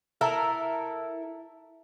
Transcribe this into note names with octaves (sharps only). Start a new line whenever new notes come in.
E4 A4 A#4 E5